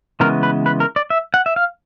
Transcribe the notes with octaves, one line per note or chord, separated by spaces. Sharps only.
C#3 E3 G#3 B3 A#4
B4
B4
A#4
D5
E5
F#5
E5
F5